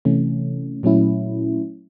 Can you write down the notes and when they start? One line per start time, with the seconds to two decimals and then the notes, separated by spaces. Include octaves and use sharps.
0.05 C3 E3 A3 C#4
0.83 A#2 F#3 A3 C#4 E4